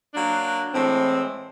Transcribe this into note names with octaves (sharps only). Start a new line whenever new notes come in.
F#3 A#3 D4
A2 E3 G#3 C4